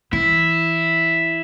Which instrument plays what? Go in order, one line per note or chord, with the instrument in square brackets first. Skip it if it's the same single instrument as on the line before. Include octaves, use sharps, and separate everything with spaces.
[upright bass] E3 [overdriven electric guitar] E4